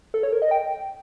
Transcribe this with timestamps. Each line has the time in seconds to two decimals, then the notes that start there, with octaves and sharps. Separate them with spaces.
0.14 A4
0.23 C#5
0.33 A#4
0.42 D#5
0.51 G5